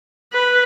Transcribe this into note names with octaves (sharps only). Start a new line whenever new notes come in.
B4